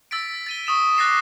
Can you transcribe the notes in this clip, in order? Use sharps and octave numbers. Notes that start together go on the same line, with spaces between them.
E6 A6 B6 D7
A6 D#7 G7
C#6 D#6 E7
D6 F#6 A6 A#6 C7 E7